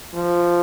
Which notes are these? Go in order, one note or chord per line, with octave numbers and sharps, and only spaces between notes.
F3